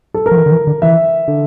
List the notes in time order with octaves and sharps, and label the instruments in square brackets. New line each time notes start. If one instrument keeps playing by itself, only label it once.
[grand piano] A4
A#4
[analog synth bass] F3
E3
D3
E3
D3
[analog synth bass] E3 [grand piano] E5
[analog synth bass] D3